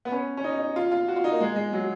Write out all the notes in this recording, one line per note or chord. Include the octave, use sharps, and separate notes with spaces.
B3
C#4
C#4
D#4
D#4
F4
F4
F#4
F4
D#4
A#3
G#3
G#3
F#3